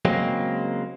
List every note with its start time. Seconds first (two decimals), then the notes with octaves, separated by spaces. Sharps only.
0.05 C#3 F#3 G#3 A#3 C4